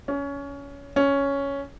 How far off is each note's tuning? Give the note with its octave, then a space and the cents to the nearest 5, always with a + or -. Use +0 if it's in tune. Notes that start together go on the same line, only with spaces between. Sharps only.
C#4 +20
C#4 +5